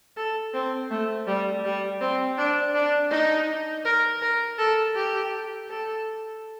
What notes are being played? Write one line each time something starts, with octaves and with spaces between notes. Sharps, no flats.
A4
C4
A3
G3
G3
C4
D4
D4
D#4
A#4
A#4
A4
G4
A4